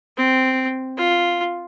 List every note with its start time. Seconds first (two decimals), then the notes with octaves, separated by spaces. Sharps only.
0.17 C4
0.97 F4